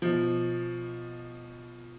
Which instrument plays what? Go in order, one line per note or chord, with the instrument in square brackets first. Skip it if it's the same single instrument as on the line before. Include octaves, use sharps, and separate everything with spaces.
[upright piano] B2 F3